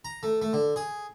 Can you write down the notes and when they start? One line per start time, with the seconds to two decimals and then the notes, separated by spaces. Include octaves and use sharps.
0.05 A#5
0.23 A3
0.42 A3
0.53 D3
0.76 G#4